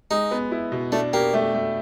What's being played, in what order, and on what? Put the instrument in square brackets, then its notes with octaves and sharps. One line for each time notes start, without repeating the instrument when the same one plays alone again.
[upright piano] G#3 [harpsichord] D#4
[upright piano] B3
E4
B2
[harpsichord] A3 [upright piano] D4
[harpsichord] A#3 [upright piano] G4
[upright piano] A3
A3